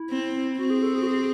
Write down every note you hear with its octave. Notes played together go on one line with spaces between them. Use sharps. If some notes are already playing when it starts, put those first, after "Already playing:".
Already playing: E4
C4
C4 F#4
G#4
A4
G#4
F#4
G#4